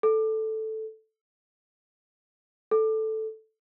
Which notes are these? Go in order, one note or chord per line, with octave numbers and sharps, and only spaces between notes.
A4
A4